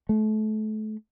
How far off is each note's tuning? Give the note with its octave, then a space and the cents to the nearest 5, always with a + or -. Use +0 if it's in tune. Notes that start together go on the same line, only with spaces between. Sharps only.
A3 -30